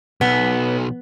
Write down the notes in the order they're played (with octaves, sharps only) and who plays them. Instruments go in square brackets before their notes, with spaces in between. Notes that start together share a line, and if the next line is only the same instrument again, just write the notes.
[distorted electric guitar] B1 [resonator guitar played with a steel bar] B3